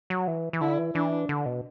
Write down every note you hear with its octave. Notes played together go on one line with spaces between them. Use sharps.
F#3
E3
E3
D3 E4
E3
E3 D4
D3
B2